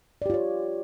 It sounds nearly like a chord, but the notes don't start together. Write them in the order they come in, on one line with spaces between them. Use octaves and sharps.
D5 G4 F4 C#5